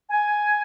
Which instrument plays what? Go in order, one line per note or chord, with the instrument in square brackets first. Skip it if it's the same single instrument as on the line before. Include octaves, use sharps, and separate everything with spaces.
[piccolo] G#5